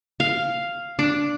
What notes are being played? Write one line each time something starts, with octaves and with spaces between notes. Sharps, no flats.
F5
D4